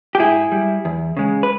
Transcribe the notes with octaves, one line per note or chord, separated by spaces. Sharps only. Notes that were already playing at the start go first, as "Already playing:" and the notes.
G4
G#2 E4 G#4
G3
E2
C#3 G#3
B4